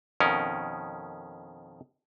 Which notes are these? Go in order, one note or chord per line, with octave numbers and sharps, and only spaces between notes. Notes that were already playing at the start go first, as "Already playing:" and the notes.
F2 B2 D#3 C#4 A#4